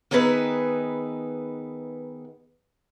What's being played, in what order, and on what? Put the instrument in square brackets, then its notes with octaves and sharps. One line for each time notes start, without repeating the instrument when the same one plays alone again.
[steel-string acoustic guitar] D#3 B3 D#4 G#4 B4 E5